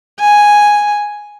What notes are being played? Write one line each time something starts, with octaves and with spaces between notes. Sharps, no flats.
G#5